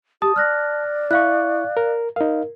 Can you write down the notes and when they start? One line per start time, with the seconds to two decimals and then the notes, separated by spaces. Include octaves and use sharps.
0.22 G4 A5 D#6
0.36 D5 F6 F#6 A#6
1.11 E4 F5 C#6 F#6
1.77 A#4
2.16 D#4 A#4 F5